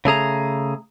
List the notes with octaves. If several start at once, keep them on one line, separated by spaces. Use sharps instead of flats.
C#3 A3 G#4 A#5